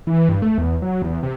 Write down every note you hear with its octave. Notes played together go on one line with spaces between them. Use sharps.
E3
G2
A3
E2
F#3
E2
C3